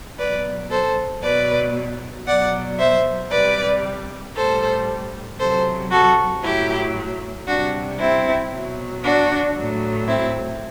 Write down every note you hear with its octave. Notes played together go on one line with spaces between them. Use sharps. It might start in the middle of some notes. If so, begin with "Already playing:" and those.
B2 F#3 B4 D5
A4 C5
B2 F#3 B4 D5
B2 F#3 D5 F#5
C5 E5
C3 G3 B4 D5
A2 G3 A4 C5
C3 F#3 A4 C5
F#4 A4
A2 F#3 E4 G4
C3 G3 D4 F#4
C4 E4
B2 F#3
D4 F#4
A2 F#3
C4 E4